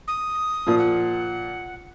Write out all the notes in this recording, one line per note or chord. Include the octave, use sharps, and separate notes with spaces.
D#6
A#2 F3
F#5